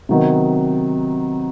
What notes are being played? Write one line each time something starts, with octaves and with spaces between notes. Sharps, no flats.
C3 D#3 F#3 B3 D#4